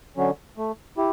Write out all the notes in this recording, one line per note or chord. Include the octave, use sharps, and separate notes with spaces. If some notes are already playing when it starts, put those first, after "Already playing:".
D3 F#3 C#4
A3
E4 G4